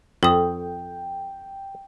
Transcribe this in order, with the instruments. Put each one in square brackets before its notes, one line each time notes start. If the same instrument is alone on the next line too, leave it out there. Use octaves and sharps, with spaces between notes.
[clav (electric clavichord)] F2 [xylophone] A4 D#6 [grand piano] G5